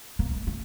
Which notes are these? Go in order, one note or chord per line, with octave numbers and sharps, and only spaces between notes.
A#3
A3
A3